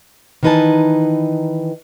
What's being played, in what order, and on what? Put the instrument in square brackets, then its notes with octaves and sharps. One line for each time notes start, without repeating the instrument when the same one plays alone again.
[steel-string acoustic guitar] D#3 E3 D#4 B4 G#5 A5